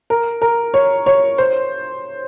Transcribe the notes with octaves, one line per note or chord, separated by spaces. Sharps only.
A#4
A#4
C#5
C#5
C5